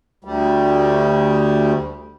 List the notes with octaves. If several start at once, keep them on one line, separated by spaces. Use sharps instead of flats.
D2 G3